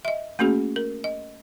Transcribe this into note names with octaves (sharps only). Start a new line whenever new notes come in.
D#5 E5
A3 A#3 C#4 F#4 G#4
A#4
D#5